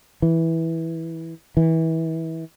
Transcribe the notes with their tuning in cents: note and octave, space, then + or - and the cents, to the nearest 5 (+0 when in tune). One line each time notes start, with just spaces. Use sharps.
E3 -10
E3 -25